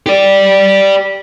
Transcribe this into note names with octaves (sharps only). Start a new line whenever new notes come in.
G4 D5